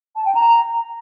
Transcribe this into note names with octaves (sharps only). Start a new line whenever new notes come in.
A5
G5
A#5